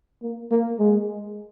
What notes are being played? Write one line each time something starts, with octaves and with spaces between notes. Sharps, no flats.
A#3
A#3
G#3